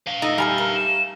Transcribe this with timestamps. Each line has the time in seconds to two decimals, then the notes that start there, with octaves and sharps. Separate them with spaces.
0.07 B4 F5
0.22 A3 D#4 D#5 A#5
0.38 G3 A4 G#5 A#5 F6
0.58 A3 A#4
0.75 E7